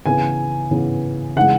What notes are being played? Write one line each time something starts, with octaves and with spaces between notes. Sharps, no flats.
C#3 E3 B3 G#5
C#3 E3 B3
C#3 E3 G#3 F#5